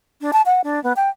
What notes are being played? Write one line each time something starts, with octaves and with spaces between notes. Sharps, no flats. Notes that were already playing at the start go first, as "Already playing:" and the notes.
D4
A5
F#5
D4
B3
G5